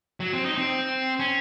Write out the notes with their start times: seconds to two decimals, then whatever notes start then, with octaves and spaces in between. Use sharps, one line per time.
0.20 F#3
0.33 C4
0.45 D#4
0.58 C4
1.20 C#4